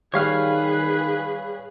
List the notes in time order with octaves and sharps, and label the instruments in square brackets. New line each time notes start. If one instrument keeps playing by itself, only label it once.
[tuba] D#3 [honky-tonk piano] G3 [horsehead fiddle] G#4 B4 [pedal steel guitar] C#5 F5 F6